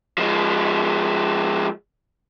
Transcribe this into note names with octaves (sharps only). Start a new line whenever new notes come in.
F3 G#3